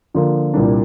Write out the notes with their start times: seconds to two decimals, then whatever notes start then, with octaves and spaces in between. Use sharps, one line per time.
0.14 D3 F3 A#3 F4
0.54 C2 A#2 G3 A#3 D4